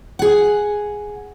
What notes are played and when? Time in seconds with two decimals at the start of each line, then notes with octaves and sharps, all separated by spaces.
0.19 G#4 F#5